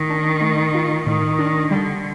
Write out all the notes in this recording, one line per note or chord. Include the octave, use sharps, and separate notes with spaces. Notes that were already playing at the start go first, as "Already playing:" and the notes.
Already playing: A2 D#3
D4
A3
F4
A2 D#3
D4
D3 G3